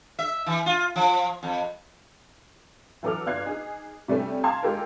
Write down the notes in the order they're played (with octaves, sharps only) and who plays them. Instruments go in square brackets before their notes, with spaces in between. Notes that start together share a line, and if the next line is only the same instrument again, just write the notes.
[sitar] E5
E3
F4
F3
F2
[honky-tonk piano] E3 F#3 A4 D6 F6
G1 D4 F5 F#6 G#6 C7
D#4 G#4
C3 G3 A3 C#4
F5 A5 A#5 C6 G#6
G#3 A#3 F4 G4 A4 A#4